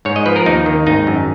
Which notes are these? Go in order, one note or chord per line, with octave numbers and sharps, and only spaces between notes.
G#2 C#5
D#5
F3 B4
A#4
D#2 D#4
D#3
G#1 D#4
F#2